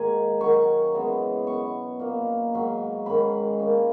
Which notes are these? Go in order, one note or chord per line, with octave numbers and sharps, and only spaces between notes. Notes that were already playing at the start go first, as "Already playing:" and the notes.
Already playing: G#2 D#3 G#3 A#3 D#4 G#5 A#5
D#3 F#3 C#4 C#6
C#3 E3 G#3 B3
B2 F#3 B3 C#6
A#2 A#3 D#4
G#2 F#3 C#4
G#2 D#3 G#3 C#4 B5
A#2 A#3 C#4